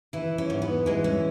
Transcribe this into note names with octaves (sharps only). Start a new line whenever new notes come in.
E3 E4
C#4
G#2
B3
E3 G#3
C#4